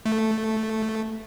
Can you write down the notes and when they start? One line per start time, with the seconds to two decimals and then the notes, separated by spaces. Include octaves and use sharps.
0.06 A3